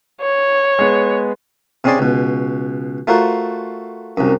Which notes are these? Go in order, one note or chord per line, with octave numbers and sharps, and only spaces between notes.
C#5
G#3 B3
C3 C4 C#4 G#4 D5 C6
C#2 B2
A3 F4 F#4 A#4 C5
C2 F#2